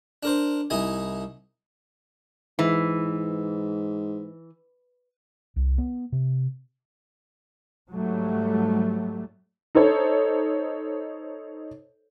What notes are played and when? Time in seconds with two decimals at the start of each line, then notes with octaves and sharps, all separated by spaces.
0.23 D4 A#4 C5
0.70 C2 D#4 E4 D#5 G#5
2.59 G#2 E3
5.56 C2
5.78 B3
6.12 C3
7.90 G#2 F#3 G3 A3
9.75 D#4 A4 C5 C#5